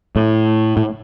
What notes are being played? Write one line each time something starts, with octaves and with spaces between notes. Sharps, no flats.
A2
A2